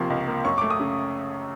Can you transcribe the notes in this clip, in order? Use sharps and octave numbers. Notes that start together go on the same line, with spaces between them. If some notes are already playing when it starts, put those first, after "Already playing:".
Already playing: C#2 C3 F3 A#3 C6 C#6
C#2
A#3
F#2 C#6
A3 D6
D#6
C#3